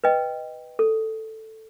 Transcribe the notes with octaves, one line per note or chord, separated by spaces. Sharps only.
B4 D#5 G5
A4